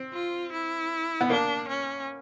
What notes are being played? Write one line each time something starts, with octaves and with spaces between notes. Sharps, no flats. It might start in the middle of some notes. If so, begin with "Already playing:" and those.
Already playing: C4
F4
E4
B3
A#3 D4
C#4